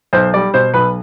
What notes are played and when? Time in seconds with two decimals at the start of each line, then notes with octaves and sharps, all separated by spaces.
0.13 B1 C5
0.34 G3 D5
0.54 B2 C5
0.74 B1 B4